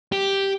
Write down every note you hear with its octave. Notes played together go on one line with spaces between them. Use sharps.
G4